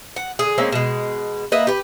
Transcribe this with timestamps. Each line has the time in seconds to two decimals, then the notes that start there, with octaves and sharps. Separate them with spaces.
0.16 F#5
0.39 D3 G#4
0.58 G#3 A#3 C4 C#4
0.72 B2 G#3
1.52 A#3 B4 D#5 E5
1.67 G4 B4